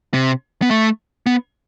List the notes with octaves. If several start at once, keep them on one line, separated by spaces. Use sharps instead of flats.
C3
B3
A3
B3